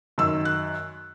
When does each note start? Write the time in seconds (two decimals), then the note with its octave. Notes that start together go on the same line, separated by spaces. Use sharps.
0.18 F#2 D#3 F#3 E6
0.45 F#6